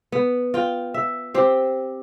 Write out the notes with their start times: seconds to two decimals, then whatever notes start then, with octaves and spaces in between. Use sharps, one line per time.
0.12 B3
0.54 F4 G5
0.94 E5
1.34 C4 G4 C5